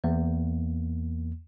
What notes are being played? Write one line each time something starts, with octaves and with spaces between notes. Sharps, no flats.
E2 A#3